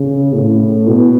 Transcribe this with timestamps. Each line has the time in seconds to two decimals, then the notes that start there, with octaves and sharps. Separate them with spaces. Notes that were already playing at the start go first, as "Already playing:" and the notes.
Already playing: C#3
0.34 A2
0.87 B2